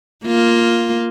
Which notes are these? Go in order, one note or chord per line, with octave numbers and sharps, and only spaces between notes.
A#3 F4